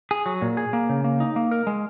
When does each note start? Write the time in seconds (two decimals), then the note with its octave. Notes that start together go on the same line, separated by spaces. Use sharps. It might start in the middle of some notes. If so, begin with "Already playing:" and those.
0.11 G#4
0.26 F#3
0.42 A#2
0.57 G#4
0.73 A#3
0.89 C#3
1.04 A#3
1.20 D#4
1.36 A#3
1.51 A#4
1.67 G#3